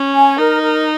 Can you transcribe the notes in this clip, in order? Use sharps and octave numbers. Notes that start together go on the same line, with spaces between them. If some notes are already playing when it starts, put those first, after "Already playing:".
Already playing: C#4
G#5
D#4 A#4
A#4